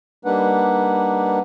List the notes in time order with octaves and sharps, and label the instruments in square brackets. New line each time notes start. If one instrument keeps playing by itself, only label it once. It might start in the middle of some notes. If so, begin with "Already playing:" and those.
[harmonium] G3 A#3 D4 D#4 B4 F#5